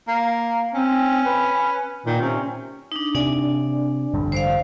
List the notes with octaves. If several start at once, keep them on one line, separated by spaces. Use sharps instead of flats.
A#3
C4 C#4
B4
A#2 D#3
C3 C#4
D4 D#4
C3 D4 D5 G#5
A1 G2 D3
C5 D5 F5